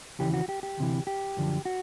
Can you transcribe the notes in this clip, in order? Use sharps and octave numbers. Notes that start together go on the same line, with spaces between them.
D#2 C#3 E3 G4
F#4
G4
G4
D2 C3 E3
G4
F#2 D3 F3
F#4